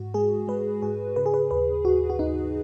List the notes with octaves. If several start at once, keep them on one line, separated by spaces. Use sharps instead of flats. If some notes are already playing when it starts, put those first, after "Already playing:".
Already playing: G#2 F#4
G#3 G#4
G#3 B4
G#2 G#4
C#3 B4
G#4
B4
D#2 B4
D#2 F#4
F#4
D#2 D#4